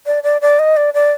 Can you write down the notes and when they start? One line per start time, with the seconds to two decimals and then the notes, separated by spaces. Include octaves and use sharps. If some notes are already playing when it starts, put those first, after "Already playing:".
0.06 D5
0.23 D5
0.41 D5
0.59 D#5
0.77 D5
0.94 D5